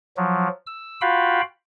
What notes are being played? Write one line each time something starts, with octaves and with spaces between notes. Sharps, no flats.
F3 F#3
E6
F4 F#4 F5 G5 B5